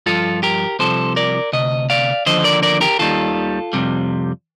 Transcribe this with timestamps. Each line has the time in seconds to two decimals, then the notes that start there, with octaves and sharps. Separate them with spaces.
0.06 G2 F3 F4 A4
0.43 G4 A#4
0.79 C2 C3 F3 A4 C5
1.16 A#4 D5
1.53 D2 C3 D#5
1.90 D5 F5
2.26 D#2 D3 F3 C5 D#5
2.44 A#4 D5
2.63 A#4 D5
2.81 G4 A#4
2.99 D#2 D#3 G3 F4 A4
3.73 F2 C3 G3